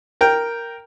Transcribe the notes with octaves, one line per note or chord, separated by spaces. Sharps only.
A#4 G5